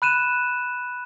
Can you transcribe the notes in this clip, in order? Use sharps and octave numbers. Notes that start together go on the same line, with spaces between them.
B5 F#6 D#7 E7